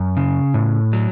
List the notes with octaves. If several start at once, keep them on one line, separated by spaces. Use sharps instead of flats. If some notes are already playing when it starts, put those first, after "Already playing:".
Already playing: F#2
C#3
A2
F#3